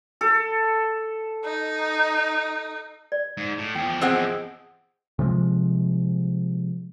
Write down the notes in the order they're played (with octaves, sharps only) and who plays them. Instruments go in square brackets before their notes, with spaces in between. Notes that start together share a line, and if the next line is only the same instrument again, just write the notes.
[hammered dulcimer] A4
[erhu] D#4
[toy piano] D5
[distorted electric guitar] G#2
A2
[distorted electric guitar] E2 F3 [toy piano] G5
[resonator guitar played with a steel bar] C4 G#4 G5 [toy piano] C5 D#5 F#5
[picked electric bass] C3 F3 G#3